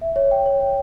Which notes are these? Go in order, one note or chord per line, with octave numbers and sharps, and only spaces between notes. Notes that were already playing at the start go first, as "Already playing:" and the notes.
E5
C#5
G5
C#5
C#5